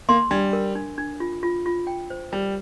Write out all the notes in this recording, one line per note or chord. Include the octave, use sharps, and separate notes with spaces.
A#3 C6
G3 D4
A#4
D4
D4
F4
F4
F4
G5
C5
G3 A#4